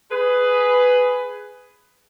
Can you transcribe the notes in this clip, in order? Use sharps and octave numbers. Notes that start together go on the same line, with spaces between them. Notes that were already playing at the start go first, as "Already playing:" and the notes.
G#4 B4